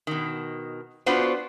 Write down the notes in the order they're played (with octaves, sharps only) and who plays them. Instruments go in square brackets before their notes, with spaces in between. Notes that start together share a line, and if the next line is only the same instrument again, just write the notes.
[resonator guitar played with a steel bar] B2 D#3
B3 D4 F4 F#4 B4 C5